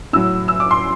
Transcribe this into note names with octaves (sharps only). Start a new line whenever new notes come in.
A2 F#3 E6
E6
D6
C6